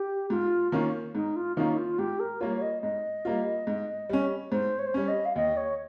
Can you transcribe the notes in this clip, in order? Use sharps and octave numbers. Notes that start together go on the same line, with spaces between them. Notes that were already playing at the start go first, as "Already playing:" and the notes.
Already playing: G4
G#2 F4
D#3 A#3 C#4 F4
G#2 D#4
F4
D#3 A#3 C#4 D#4 F4
D#4
F4
G#2 G4
A#4
G3 A#3 F4 C#5
C#5
D#5
G#2 D#5
G3 A#3 F4
G#2
G3 C#4
G#2 C5
C#5
C5
G3 C#4 C#5
D#5
F5
D#2 D#5
C#5